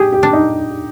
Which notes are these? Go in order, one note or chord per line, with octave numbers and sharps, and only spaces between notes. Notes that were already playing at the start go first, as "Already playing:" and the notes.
Already playing: G4 G#4
G4
D4
D#4